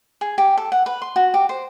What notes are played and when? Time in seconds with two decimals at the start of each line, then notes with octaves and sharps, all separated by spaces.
0.21 G#4
0.38 G4
0.58 A4
0.72 F#5
0.86 B4
1.02 C6
1.16 F#4
1.34 G4
1.49 C5